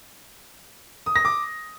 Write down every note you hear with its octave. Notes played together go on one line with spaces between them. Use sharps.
D#6
A#6
D6